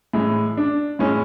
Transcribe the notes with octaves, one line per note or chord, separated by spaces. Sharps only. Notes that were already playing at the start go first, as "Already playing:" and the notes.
A2 E3 G#3
D4
A2 E3 G#3 C#4